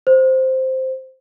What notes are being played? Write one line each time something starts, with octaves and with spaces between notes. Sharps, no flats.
C5